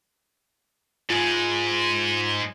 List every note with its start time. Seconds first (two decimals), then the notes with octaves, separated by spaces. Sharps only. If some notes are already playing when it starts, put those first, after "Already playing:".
1.10 G#2 G#3 F4 D7